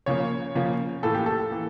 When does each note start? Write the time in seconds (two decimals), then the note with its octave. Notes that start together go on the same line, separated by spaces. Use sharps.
0.06 C#3 F3 A#3 C#5
0.55 C#3 F3 A#3
1.03 A2 E3 A#3 A4
1.14 G4
1.26 A4
1.51 E3 A#3